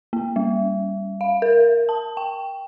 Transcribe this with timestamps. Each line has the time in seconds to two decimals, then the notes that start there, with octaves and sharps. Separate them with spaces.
0.13 A#3
0.36 G3
1.21 F5
1.42 A#4
1.89 A5
2.17 G5